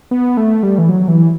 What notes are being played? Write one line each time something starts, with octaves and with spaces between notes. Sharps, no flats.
B3
A3
G3
E3
F#3
E3